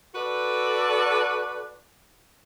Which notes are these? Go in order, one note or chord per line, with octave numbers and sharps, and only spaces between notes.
F#4 A4 B4 D5